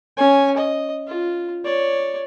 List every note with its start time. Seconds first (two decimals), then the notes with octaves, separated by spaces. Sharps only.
0.17 C#4 G#5
0.56 D#5
1.07 F4
1.65 C#5 D5